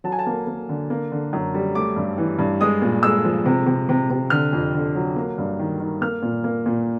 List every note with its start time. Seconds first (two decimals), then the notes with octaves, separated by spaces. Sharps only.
0.04 F#3 A5
0.12 G#5
0.19 A5
0.26 A#3
0.47 A#3
0.69 D3
0.90 A#3
1.12 D3
1.33 F#2
1.54 G3
1.75 A3 D6
1.96 G2
2.18 E3
2.39 G2
2.61 G#3 D#6
2.82 A#2
3.03 G#3 E6
3.24 F3
3.46 C3
3.66 C3
3.89 C3
4.10 C3
4.30 D3 F6
4.53 F2
4.74 D3
4.95 F#3
5.16 A#3
5.38 G2
5.59 D#3
5.80 D#3
6.01 A#3 F6
6.22 A#2
6.44 A#3
6.66 A#2